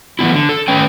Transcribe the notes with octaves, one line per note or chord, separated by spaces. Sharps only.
E3 A3 B3 E4
D3
A4
A2 D#3 C#4 B4 G5